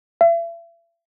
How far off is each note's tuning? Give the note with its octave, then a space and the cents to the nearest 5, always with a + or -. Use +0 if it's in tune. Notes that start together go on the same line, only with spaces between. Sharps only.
E5 +40